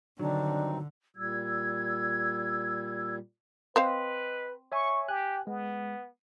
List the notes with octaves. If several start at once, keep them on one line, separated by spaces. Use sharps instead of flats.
G2 D3 D#3 F#3 C4 D4 D#4
A#2 G3 E6 G#6
C4 B4 C5 D#5 F5
C#5 E5 G#5 C#6
G4 G#5 F#6
G#3 B3